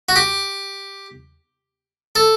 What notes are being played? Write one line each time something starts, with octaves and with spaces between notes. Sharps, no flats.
F#4
G4
A4